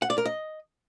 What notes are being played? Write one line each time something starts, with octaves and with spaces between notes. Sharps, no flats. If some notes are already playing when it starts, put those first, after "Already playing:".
F#5
D5
A#4
D#5